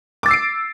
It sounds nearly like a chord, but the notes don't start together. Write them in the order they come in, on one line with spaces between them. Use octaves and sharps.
D6 A6 E6 C7 D7